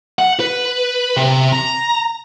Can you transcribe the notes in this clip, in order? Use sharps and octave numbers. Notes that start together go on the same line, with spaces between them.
F#5
B4
C3
A#5